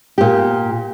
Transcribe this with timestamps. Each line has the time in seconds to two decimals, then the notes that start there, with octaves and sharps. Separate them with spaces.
0.18 A#2 G4